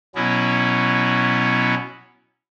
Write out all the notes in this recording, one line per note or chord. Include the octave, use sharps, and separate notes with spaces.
B2 F#3 B3 C#4 E4